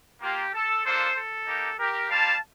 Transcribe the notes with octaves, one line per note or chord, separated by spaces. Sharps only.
A#3 F4 G4
A4
A#3 D4 F4 A4 C5
A4
A#3 D#4 G4
G4 A#4
G3 A#3 F4 F5 A5